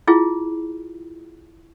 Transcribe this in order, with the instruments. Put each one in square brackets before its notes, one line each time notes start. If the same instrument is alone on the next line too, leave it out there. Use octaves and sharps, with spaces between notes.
[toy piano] E4 F4 G#4